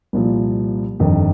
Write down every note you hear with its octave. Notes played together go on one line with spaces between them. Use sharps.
C2 A#2 F3
G1 F2 D#3